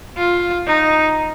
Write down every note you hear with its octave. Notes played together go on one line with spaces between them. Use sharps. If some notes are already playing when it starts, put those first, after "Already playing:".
F4
D#4